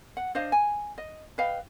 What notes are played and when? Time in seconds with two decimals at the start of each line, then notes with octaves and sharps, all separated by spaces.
0.17 F#5
0.35 D4 C5 D#5 F5
0.52 G#5
0.98 D#5
1.38 B4 D#5 F5 G5